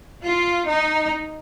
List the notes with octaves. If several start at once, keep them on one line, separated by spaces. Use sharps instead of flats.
F4
D#4